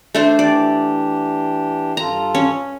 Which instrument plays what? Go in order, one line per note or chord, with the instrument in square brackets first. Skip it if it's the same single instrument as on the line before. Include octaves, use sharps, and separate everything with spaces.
[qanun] A3 D4 C5
[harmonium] E3 D4 G4 [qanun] D5
[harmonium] G2 F4 A4 [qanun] A#5
[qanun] C#4